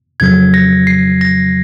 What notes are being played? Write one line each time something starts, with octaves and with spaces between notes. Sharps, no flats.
F2 C#3 F#3 G#6
A#6
C7
A#6